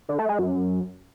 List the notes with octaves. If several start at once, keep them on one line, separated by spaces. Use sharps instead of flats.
D3
A3
G#3
F#2